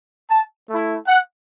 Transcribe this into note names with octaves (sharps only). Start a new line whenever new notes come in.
A5
A3 E4
F#5